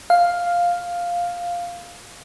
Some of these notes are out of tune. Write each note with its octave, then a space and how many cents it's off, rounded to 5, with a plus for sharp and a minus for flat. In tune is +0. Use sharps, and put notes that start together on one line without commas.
F5 +5